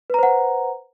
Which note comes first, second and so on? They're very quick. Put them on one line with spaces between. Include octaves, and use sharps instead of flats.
B4 A#5 C5 F#5